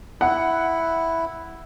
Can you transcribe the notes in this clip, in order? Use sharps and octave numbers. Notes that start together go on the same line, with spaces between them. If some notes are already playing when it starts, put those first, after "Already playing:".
E4 F#5